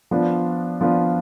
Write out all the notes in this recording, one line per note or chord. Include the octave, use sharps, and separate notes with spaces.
F3 B3 D4 F4
F3 B3 D4 F4